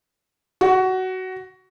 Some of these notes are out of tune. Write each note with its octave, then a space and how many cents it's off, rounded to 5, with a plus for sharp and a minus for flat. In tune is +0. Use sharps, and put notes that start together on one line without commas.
F#4 +15